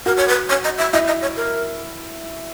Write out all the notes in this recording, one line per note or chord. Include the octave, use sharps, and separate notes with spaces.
F#4 A#4
C#5
B4
C#5
D#5
E5
E4 D#5
D#5
C#5
A#4